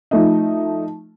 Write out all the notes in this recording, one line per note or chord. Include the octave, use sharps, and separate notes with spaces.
F3 A3 D#4